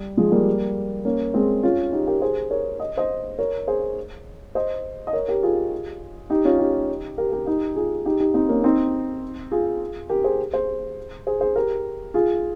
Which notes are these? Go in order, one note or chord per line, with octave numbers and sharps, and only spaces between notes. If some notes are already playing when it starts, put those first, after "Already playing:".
Already playing: G3
F3 G#3
G3 A#3
A#3 C#4
G#3 C4
C#4 F4
D#4 G4
G4 A#4
G#4 C5
A#4 C#5
D#5
C5 D#5
A#4 C#5
G#4 C5
C5 D#5
D#5
A#4 C#5
G4 A#4
F4 G#4
D#4 G4
C#4 F4
D#4 G4
G4 A#4
G4 A#4
D#4 G4
F4 G#4
D#4 G4
D#4 G4
C4 D#4
A#3 C#4
C4 D#4
F4 G#4
G4 A#4
G#4 C5
G#4 C5
G#4 C5
G#4 C5
G4 A#4
F4 G#4